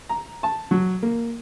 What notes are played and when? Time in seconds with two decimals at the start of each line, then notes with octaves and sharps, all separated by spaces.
0.09 A#5
0.43 A5
0.71 F#3
1.03 A#3